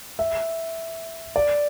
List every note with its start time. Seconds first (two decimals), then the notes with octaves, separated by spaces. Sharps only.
0.19 E5
1.36 D5